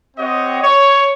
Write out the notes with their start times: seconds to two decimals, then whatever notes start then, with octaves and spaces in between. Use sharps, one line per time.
0.17 C4 G4 C#5 D#5 F#5
0.62 C#5